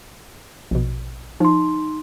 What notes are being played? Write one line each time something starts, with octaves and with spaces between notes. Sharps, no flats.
A#1 B2
F3 D#4 C6